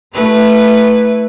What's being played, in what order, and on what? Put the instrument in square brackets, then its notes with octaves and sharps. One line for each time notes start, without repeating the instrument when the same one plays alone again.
[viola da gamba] A3 E4 B4